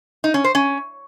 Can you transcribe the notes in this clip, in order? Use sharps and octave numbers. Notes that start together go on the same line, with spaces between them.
D#4
C#4
C5
C#4